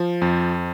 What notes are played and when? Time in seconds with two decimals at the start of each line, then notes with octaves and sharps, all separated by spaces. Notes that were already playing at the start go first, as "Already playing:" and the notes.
Already playing: F3
0.22 F2